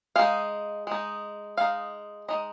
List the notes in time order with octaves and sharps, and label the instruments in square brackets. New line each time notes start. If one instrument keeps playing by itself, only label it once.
[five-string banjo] G#3 D#4 F5
G#3 D#4
G#3 D#4 F5
G#3 D#4 D#5